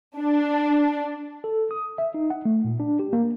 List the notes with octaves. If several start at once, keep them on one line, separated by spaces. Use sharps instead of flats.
D4
A4
D#6
E5
D#4
F#5
A3
A#2
D4
G4
A#3